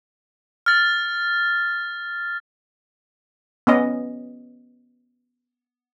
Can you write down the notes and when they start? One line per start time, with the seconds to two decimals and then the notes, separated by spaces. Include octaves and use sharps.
0.66 F6 A6
3.67 B3 C#4 D#5